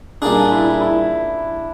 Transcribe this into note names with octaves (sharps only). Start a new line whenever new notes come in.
A#2 G3 A#3 D4 D#4 G#4
E4
E4